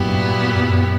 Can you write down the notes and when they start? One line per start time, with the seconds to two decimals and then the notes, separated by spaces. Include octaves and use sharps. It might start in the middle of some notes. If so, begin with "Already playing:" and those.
Already playing: G2 A#2 F#3 B3 E4 G4
0.51 F#2